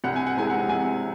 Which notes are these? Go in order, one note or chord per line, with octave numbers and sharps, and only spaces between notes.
C2 F#5
G#5
F#5
C3 E3 G#3 G#5
F#5
C2 G#5